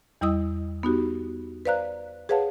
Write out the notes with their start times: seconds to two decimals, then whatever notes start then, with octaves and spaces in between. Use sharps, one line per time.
0.21 E2 G3 E4 D#5 D#6 E6
0.83 B3 D#4 F#4 G4
1.65 B4 C5 D5 F5 A#5 F#6
2.29 G#4 B4 C#5 F5 F#5 A5